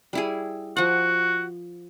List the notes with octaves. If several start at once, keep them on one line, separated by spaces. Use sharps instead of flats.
G3 E4 G#4
F3 F#4 F#5